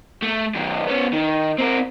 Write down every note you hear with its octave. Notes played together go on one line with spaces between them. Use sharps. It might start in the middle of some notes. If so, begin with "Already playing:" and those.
A3
F#2 D#3
B3 C#4
D#3
C4 A#4